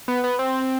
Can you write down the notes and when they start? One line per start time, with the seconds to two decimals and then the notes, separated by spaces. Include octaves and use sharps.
0.08 B3
0.24 B3
0.39 C4